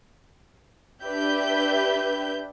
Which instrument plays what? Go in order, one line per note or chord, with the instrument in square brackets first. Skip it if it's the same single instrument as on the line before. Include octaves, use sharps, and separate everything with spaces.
[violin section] D4 G4 B4 E5 G6